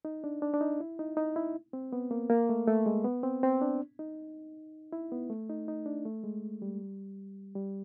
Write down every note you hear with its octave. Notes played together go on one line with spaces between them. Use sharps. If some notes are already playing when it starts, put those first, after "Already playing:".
D#4
D4
D4
D4
D#4
E4
D#4
D#4
E4
C4
B3
A#3
A#3
A3
A3
G#3
B3
C4
C4
D4
D#4
E4
B3
A3
D#4
D#4
D4
A3
G#3
G3
G3